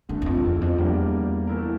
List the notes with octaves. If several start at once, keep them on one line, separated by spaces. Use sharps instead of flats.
G2 D3 A3 D4
E2
F2
E2
F2
E2 G3 A#3 D4 G4
E3 A3 E4 A#4